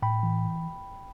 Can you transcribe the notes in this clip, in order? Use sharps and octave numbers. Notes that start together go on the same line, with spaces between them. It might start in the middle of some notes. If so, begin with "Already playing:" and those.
A2 G5 B5
E3